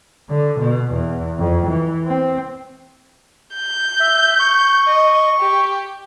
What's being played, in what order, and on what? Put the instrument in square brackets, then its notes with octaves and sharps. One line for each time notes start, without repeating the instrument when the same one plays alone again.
[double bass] D3
B2
E2
F2
E3
C4
[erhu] G6
[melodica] E5
C#6
[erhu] D#5
G4